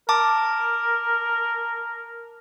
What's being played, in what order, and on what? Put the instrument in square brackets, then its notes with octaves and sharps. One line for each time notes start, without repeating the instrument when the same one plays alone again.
[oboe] A#4 [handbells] A5 D6